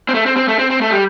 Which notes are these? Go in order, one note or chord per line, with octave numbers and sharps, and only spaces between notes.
C4
A3
C4
C4
A3
C4
C4
A3
G3